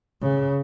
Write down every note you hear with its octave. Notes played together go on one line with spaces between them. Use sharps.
C#3